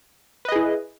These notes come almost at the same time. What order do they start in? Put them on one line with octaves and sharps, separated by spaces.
B4 D#5 G#4 E4